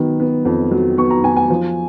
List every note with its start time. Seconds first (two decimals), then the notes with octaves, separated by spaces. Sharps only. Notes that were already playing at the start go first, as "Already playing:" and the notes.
Already playing: D#3 F#3 B3
0.20 B3
0.45 F2
0.71 F#3
0.98 B3 C#6
1.10 A#5
1.24 B3 G#5
1.36 G#5
1.50 F3